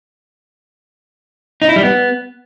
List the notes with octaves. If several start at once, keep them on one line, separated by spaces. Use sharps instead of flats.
D#4
E4
G3
B3